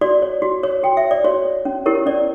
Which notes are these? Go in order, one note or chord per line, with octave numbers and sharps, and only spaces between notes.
F#4 D5
C#5
F#4
C#5
F#4 G5
E5
C#5
D5
F#4 C#5
C#5
C#4
E4 G4 A#4 C#5
C#4 D5